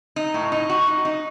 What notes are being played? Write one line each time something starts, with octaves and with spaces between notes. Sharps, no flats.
D#4
A2
D#4
F#4
D#4
D#4